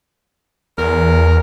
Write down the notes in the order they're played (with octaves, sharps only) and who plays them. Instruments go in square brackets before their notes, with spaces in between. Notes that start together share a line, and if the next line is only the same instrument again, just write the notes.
[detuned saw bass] E2 [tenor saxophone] A#4